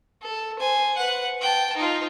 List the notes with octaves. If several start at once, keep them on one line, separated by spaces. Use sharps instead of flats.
A4
C5 G#5
B4 F#5
G5 A5
D#4 F4